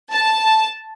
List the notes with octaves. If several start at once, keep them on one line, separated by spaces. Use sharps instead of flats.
A5